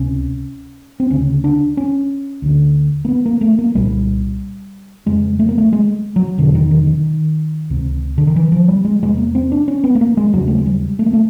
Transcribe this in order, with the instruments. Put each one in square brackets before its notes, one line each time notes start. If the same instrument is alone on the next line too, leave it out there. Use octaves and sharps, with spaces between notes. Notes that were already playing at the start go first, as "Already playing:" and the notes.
Already playing: [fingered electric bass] C#2 C3 C#4
C4
D2 C#3 C#4
D4
C#4
D2 D3
A#3
B3
A#3
A3
A#3
C2 A#2 G3
F2 C#3 G#3
A3
A#3
A3
G#3
F#3
E2 B2 D3
D#3
D#3
D#3
C#2 C3
D3
D#3
E3
F3
G3
G#3
E2 C3 G#3
A#3
C4
D4
C#4
B3
A3
A#3
G#3
D#2 C#3 F#3
A3
G#3
G3
A3
A#3
A3